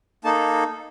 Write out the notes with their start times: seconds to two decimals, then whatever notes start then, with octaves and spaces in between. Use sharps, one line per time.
0.24 A#3 D#4 A4 A5